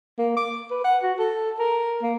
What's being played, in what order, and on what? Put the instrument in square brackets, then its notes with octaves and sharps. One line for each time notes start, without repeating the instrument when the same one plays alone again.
[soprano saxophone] A#3
D6
B4
F#5
F#4
A4
A#4
A#3